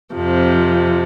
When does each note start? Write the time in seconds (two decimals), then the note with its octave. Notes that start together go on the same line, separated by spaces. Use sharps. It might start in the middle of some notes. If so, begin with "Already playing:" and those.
0.14 F2 C3 F3